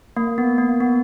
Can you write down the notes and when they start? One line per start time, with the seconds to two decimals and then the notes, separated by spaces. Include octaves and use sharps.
0.17 A#3
0.38 B3
0.58 A#3
0.80 B3